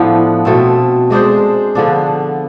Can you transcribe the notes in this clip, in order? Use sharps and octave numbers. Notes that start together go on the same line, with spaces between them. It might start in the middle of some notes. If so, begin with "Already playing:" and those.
Already playing: A2 F3 B3 D4
B2 A3 C4
G#3 D4 G#4 C5
D3 F3 B3 D4